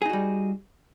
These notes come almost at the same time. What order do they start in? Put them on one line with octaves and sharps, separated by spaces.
G#4 D#4 F#4 G3